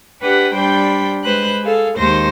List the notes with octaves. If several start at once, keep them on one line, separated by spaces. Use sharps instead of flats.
D4 G4 B4 F#5 G5
G3 D4 C5 G5 B5 G6
G#3 B4 C5 B5 F#6
G#4 A4 F5
D#2 G#3 D#4 C5 C6 A#6